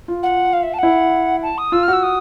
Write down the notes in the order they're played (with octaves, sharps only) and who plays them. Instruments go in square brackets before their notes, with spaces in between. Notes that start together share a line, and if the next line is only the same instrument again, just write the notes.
[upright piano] F4
[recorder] F#5
F5
E5
A5
[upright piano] E4 [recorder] F#5
[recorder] A5
D#6
[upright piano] F4 [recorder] E6
[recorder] F6
[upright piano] F#4 [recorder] E6
[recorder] D#6